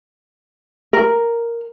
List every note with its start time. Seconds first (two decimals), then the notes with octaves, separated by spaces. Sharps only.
0.93 A#4